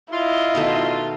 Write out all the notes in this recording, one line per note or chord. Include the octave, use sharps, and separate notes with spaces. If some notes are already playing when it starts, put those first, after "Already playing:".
E4 F4 D#5
B2 D#3 A3